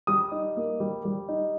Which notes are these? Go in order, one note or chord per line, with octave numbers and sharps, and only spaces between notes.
G3 D#6
D#4
A#3
G3
G3
D#4